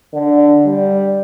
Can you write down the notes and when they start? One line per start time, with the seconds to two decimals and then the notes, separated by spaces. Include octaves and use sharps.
0.14 D3
0.67 G3